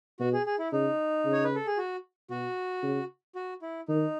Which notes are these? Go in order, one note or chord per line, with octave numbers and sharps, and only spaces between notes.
B2 F#4
G#4
G#4
E4
C#3 D#4
C#3
C#5
B4
A4
G#4
F#4
B2 F#4
C#3
F#4
E4
D#3 D#4